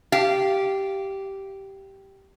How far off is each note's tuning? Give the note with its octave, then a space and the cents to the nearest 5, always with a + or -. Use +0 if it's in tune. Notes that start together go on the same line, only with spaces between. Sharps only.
G4 -10 F5 -15